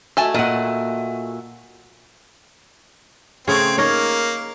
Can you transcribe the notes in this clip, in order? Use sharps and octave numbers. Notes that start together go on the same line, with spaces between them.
A3 F#4 E5 G#5 A5
A#2 D#5 F#5
C#3 A3 C4 G#4 C#5
A#3 D#4 A#4 C#5